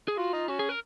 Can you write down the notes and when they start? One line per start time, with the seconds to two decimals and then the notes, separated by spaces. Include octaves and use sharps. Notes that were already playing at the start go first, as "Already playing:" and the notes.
0.08 G#4
0.17 F4 F#4
0.33 D#4 F4
0.48 C#4 F#4
0.59 G#4
0.69 A#4